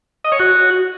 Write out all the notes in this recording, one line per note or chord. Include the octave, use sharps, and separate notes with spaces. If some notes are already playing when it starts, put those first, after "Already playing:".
D#5
C#5
F#4